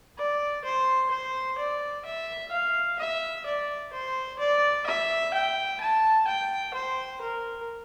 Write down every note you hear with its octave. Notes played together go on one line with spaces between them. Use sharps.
D5
C5
C5
D5
E5
F5
E5
D5
C5
D5
E5
G5
A5
G5
C5
A#4